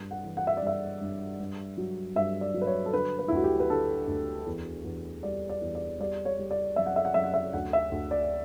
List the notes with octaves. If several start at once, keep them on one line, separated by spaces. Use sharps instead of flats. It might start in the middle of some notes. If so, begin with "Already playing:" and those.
Already playing: G2
F#5
E3
F#5
E5
D5
G2 E5
G2
G2
F#3
G2 E5
D5
F#3
B4
C#5
A4
D3 B4
B4
E4
D2 F#4
G4
B4
D3 A4
D2
E2
E2
G3 D5
D5
E2
D5
G3 D5
C#5
G3
D5
F#2 E5
F#5
E5
F#5
F#2 E5
F#5
E5
D2 F#5
E5
D2
D5